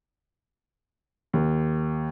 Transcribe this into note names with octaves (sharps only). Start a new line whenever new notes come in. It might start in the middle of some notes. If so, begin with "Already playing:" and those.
D#2